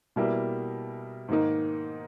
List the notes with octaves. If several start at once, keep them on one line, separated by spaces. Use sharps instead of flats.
B2 G3 A#3 E4
G#2 D#3 A#3 D#4